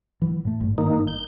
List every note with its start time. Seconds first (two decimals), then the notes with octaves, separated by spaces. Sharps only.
0.22 E3 F#3
0.45 A2 A3
0.60 G#1 G2
0.78 D#3 A#3 D#4
1.07 G6